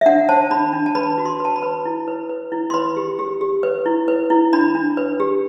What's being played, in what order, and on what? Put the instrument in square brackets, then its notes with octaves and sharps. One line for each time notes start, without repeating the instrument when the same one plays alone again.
[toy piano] E5
D4 F#5
C5 A5
D4 B5
D4
A5
B4 B5
F#4
C6
B4 A5
B5
B4
E4
B4
B4
E4
C6
B4 B5
G4
G4
G4
B4
E4
B4
E4
D4 B5
D4
B4
G4